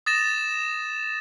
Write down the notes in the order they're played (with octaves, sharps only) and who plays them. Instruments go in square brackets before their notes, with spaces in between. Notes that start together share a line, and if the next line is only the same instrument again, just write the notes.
[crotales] D#6 A6 A#6 E7